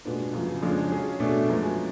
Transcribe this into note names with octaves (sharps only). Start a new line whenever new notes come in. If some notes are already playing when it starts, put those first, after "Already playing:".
B2 G#3 B3 D4 F4
F#2 C#3 F3
F2 C#3 G#3 D4 F4
F#3 C#4 G#4
B2 A3 D4 G#4 D5
F#2 F3 G#3 B3